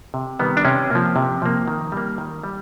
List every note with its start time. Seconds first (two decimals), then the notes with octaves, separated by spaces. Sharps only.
0.14 C3
0.39 D#3 G3 B3
0.57 D4
0.65 C3 C#4
0.90 F3 A#3
1.16 C3
1.42 F3 A#3
1.68 D#3
1.92 G3 A#3
2.18 D#3
2.43 G3